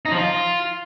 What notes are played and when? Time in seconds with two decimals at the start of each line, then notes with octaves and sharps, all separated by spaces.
0.05 D#4
0.12 F3
0.18 F4